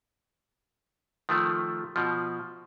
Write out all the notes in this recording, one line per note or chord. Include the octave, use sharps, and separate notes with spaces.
D#3 F3 A3
B2 F3